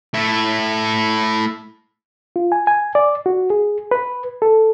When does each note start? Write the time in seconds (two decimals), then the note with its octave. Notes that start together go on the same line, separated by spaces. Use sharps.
0.14 A3 E4
2.36 F4
2.52 G#5
2.67 G#5
2.95 D5
3.26 F#4
3.50 G#4
3.91 B4
4.42 A4